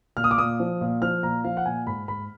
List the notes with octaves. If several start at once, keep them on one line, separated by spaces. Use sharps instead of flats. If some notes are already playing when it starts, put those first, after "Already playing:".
A#2 F6
D#6
D6
A#2 D#6
F3
A#2
F3 F6
A#2 A#5
F3 F5
F#5
A#2 G#5
G#2 B5
G#2 B5